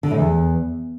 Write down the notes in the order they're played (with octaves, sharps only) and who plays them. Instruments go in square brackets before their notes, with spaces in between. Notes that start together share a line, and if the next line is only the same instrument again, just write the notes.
[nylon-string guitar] D3
A2
E2